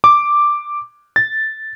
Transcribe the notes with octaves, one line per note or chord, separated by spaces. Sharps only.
D6
A6